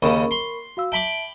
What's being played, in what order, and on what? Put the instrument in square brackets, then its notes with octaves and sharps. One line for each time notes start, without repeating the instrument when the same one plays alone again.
[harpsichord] D#2 C#3 [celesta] A#4 B5 C#6
[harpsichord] C6
[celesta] F#4 F5 E6
[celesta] E5 A5 [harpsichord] G5 B5 D6